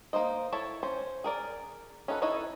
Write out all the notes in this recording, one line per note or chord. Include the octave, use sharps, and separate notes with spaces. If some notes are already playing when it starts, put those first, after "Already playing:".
A#3 D#4 C5 D#5
E4 A4 C#5 A5
C#4 C5
G#4 A#4 D5
C#4 D#4 F#4 A4 B4
D#4 E4 A4 C#5 D#5